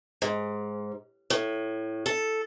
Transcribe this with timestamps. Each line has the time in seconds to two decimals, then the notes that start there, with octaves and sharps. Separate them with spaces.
0.22 G#2
1.30 A2
2.06 A4